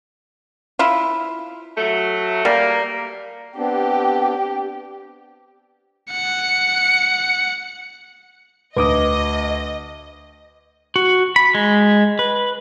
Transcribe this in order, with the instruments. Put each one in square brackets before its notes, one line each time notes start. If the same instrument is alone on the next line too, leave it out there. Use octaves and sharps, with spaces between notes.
[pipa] E4 F4
[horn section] F#3 A3
[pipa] G3 [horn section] A#3
[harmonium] B3 C4 D4 [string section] G4
[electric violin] F#5 C#7
[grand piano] D2 [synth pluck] B4 D6 D#6 [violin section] D#5
[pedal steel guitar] F#4
B5
G#3
B4